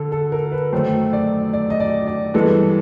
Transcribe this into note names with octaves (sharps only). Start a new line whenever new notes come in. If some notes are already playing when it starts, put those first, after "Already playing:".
Already playing: D3 A4
A4
A#4
B4
F#2 D#3 F#3 A3 C5
D5
D5
D#5
D5
D5
G2 E3 G#3 B3 A4